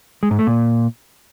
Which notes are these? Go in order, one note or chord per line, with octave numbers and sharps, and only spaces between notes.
G#3
G#2
A3
A#2